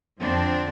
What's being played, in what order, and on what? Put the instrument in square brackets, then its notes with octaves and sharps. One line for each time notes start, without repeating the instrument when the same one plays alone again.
[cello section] F2 D3 F3 C4 D4